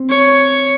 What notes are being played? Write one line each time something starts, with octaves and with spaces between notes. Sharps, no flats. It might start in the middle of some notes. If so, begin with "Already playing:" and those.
Already playing: C4
C#5